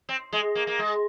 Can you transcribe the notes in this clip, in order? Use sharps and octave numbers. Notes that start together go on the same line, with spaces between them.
C4
G#3
A#3
A#3
G#3